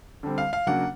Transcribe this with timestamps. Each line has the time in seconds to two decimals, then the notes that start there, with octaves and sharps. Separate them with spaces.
0.23 D3 G3 C4
0.38 F5
0.53 F5
0.67 C#3 F#3 A#3 D4 F#5